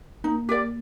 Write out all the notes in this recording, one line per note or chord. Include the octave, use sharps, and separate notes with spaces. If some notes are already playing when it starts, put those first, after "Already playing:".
A#3 D#4
G4 A#4 D5